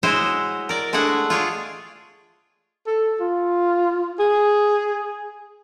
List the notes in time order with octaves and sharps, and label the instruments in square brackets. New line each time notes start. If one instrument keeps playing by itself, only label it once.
[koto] G#3 E4 F#4 C5 C#5 D#5
A#4 D5
G#3 A3 D4 G#4 F#5 G#5
F4 G#4 C#5 D5
[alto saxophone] A4
F4
G#4